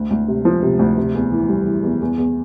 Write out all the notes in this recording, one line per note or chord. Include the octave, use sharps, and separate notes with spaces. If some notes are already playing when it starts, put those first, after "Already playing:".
Already playing: D2
D2
C3
F3
C3
D2
C3
E2
E3
G3
E3
E2
E2
E2